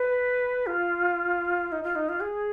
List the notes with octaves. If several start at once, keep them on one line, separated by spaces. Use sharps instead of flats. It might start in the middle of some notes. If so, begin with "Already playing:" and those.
Already playing: B4
F4
D#4
F4
D#4
F4
G#4